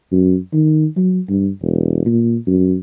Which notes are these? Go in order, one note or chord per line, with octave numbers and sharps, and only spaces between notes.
F#2
D#3
F#3
G2
E1
A#2
F#2